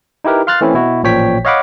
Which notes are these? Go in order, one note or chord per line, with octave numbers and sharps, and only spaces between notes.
D#4 E4 G4 A#4 B4
F5 C6 F6 F#6 A6
E3 A3 C4 C#4 E4
B2 E4 F#4
A1 A#2 F3 C#5 G5 B6
C#5 D#5 F5 F#5 B5 D6